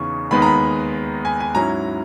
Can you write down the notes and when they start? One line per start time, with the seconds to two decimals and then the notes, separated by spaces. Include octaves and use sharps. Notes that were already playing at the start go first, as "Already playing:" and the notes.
Already playing: E2 C#3 E3 B3 D#4 C#6
0.31 D#2 D#3 G#3 B3 B5
0.42 A#5
0.46 B5
1.25 G#5
1.40 G#5
1.55 G#2 F#3 C#4 E4 A#5